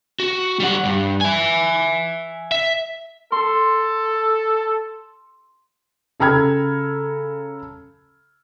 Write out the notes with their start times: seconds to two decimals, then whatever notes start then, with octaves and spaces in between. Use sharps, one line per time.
0.20 F#4
0.60 G3 F#5
0.85 G2
1.21 E5 G#5
2.51 E5
3.32 A4 C6
6.20 C#3 A4 A#5 B5 F6 G#6